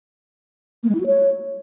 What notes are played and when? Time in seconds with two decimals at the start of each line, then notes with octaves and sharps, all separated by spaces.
0.83 A#3
0.89 G#3
0.95 E4
1.01 F#4
1.06 C#5